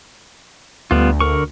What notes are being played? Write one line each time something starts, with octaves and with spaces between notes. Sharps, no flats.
D2 G3 B3 F4
D3 A#4 C#6